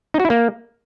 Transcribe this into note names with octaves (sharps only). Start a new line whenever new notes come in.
D#4
F#4
E4
A#3